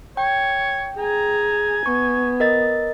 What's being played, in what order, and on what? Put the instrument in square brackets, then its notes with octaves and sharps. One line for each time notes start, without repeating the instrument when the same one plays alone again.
[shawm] C#5 [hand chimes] G5
[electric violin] G#4 A#5 [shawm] G#5
[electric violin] B3 [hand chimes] C#6
[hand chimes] A#4 D#5 A6